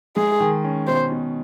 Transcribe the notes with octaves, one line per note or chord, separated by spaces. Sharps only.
G#3 G#4
D#3
C#4
B2 C5
B2